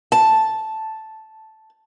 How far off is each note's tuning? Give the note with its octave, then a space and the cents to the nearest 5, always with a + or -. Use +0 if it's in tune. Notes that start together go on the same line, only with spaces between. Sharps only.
A5 -5